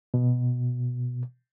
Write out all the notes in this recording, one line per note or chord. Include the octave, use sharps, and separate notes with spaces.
B2